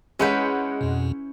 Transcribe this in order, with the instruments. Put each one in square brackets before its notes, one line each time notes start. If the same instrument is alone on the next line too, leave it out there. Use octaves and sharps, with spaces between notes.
[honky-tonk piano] G#3 F#5 G6 [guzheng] C#4 E4 B4
[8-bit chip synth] F2 B2